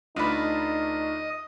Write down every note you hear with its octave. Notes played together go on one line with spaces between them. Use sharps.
D2 A3 D4 D#4 F4 B4 D#5